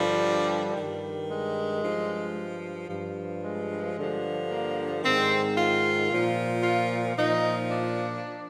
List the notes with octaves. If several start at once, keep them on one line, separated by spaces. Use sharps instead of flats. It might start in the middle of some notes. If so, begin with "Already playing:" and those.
Already playing: G2 D3 F3 G3
G2 D#3
G#3
G2 F3
G2 F3
G#3
G2 D3 F3
A#3
G#2 D#3 C4
F4
A#2 F3
F4
A#2 F3 D#4
D4